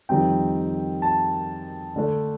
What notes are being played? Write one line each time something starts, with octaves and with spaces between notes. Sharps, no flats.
F2 D#3 G3 C4 D#4 G5
A5
D3 A3 D4